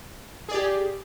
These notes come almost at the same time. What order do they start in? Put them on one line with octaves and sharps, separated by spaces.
G#4 D5 G4